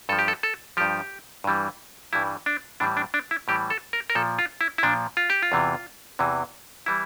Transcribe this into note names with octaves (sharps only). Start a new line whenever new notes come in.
G2 F3 A4
G4
A4
A4
G2 F3 G4
G2 E3 G3
G2 E3 G3 E4
D4
A2 E3 G3 D4
D4
D4
E4
A2 E3 G3 G4
A4
A#4
A#4
A#2 F3 A4
F4
E4
E4
A#2 F3 D4
F4
G4
F4
E2 C3 E3
E2 C3 E3
E3 G3 E4